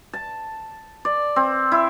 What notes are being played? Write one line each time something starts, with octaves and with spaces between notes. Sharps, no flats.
A5
D5
C4
E4